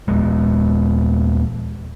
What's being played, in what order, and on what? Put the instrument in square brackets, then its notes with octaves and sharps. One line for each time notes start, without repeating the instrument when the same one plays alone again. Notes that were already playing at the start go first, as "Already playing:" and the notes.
[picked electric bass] D#1 G#3